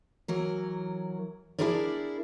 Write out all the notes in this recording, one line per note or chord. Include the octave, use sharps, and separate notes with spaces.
E3 F#3 A#4
D4 E4 F4 G#4 A#4 D5